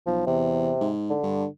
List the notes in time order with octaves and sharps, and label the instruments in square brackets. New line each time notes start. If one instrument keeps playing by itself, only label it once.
[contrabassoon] B1 [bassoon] F3
[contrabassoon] E2 [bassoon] C3
[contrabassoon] G#2
[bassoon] D3
[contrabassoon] G2